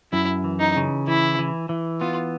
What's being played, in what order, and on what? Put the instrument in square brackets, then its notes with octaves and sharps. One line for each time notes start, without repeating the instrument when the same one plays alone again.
[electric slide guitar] F#2 [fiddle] E4
[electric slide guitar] E3
[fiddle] D#4
[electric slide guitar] C#3
[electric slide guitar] E3 [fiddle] E4
[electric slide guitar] E3
E3
[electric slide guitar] B3 [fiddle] F4